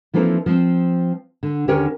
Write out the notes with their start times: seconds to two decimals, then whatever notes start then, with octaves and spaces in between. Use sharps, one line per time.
0.14 E3 F3 A#3 C4 D#4 A4
0.46 F3 C4
1.43 D3
1.68 D#2 D3 C#4 G4 A#4 C#5